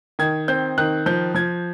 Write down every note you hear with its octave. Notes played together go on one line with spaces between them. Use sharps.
D#3 G#6
C4 G6
D#3 F#6
F3 G6
F3 G#6